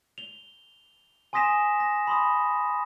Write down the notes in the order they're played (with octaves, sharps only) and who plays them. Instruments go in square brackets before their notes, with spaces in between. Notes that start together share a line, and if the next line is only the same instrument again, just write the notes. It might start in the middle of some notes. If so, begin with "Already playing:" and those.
[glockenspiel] F7 G7
G#5 C6 D#6 A#6 B6 E7
A#6
B5 C6 D#6